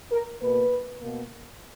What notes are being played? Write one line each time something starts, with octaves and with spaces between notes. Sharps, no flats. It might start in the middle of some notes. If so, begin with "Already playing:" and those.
A#4
B2 A#3 B4
B2 A#3